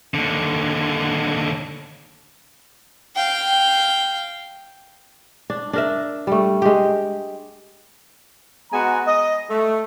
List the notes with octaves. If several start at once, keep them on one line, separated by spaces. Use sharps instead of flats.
D#2 D3
F5 G5
D4
D4 A#4 E5
G3 A3
G#3 G4
G#3 B3 F#4 G#5 A#5
D#5
A3